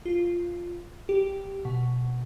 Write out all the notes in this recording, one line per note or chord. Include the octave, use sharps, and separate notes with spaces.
F4
G4
B2